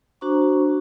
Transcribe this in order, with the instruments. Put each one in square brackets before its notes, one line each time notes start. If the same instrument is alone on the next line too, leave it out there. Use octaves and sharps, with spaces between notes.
[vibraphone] D4 F#4 C5 A#5 C#6